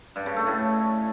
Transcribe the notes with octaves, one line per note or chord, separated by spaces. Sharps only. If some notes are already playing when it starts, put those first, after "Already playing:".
G2
C#3
A3
A2